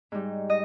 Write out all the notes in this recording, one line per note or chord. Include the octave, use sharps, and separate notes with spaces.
G#2 G3
D#5